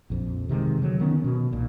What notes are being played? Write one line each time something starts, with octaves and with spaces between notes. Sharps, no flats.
A#1 F2
C3 D#3 F3 G#3
D3 F#3
D#3 B3 C#4
B2
B1 A#2